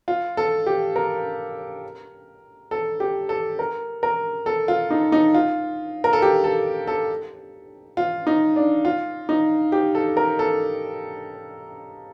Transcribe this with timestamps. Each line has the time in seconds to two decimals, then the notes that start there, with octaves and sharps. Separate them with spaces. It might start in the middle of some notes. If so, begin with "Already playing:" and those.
0.08 F4
0.37 A4
0.66 G4
0.96 A#4
2.71 A4
3.00 G4
3.29 A4
3.59 A#4
4.03 A#4
4.46 A4
4.68 F4
4.91 D#4
5.12 D#4
5.34 F4
6.04 A#4
6.13 A4
6.22 G4
6.44 A4
6.87 A4
7.97 F4
8.27 D#4
8.56 D4
8.85 F4
9.29 D#4
9.72 G4
9.95 A4
10.17 A#4
10.39 A4